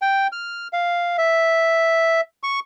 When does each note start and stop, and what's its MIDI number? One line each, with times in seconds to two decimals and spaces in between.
0.02 0.27 79
0.32 0.68 89
0.73 1.17 77
1.18 2.21 76
2.43 2.60 85